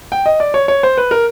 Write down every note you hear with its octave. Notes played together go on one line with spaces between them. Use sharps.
G5
D#5
D5
C#5
C#5
C5
B4
A#4